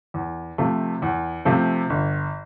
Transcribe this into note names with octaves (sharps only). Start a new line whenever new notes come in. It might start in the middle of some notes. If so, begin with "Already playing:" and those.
E2
C3 F3 A3
E2
C3 F3 A3
G1